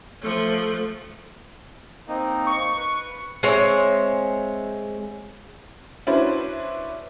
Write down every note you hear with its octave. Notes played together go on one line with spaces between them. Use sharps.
F3 A3
A#3 C4 D#4
C#6
B4
G#3 C4 C#5 E5
C#4 D4 E4 F#4 B4 C5